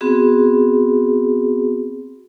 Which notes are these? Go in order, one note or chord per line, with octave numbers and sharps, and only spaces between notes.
B3 C4 F#4 G#4